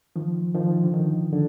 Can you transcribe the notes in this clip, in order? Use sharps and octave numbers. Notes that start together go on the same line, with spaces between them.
D#3 F3
D#3 F3
D3
D#3
D3